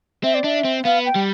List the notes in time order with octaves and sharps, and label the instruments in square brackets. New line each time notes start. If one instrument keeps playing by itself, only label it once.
[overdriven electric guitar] C4 [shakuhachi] E5
[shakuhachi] D5
[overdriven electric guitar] D4 [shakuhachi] E5
[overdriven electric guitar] C4
[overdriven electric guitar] B3 [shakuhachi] F5
[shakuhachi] G5
[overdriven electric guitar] G3